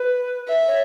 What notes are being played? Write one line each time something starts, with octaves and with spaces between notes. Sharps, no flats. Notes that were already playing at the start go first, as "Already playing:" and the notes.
Already playing: B4
E5
C#5